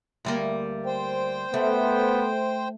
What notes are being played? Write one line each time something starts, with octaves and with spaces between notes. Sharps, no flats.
D2 G3 A#3
C5 G5
A3 B3